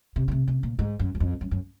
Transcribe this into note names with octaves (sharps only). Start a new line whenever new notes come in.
C3
C#3
C3
C3
A#2
G#2
F#2
F#2
F2
F#2
F#2